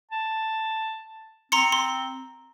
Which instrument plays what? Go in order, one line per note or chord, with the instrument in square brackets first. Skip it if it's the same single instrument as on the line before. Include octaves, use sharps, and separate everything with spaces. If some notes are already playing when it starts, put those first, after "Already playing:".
[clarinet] A5
[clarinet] C4 [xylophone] A#5 C6 C#7
[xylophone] C6